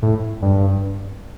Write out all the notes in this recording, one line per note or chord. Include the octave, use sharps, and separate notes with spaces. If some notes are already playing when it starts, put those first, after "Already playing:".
A2
G2